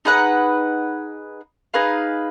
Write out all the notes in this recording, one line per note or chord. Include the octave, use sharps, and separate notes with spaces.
D#4 G#4 B4 F#5
D#4 G#4 B4 F5